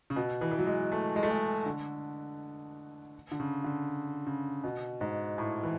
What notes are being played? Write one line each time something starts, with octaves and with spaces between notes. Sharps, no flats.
C#3
B2
E3
E3
F#3
G#3
A3
G#3
A3
G#3
D3
D3
C#3
D3
C#3
B2
G#2
A2
E3